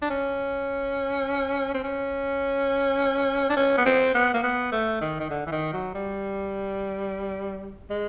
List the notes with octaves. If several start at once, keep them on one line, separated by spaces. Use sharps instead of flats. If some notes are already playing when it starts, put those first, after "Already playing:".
D4
C#4
C4
C#4
D4
C#4
B3
C4
B3
A#3
B3
A3
D#3
D#3
D3
E3
D#3
F#3
G3
G#3